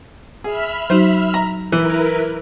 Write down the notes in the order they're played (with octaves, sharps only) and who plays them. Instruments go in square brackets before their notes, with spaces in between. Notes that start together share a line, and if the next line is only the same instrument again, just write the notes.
[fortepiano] G#4 [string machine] E5 B5 F6
[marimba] F#3 D#4 F#4 [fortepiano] C5
[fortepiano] A#5
[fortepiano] E3 [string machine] E4 A#4 B4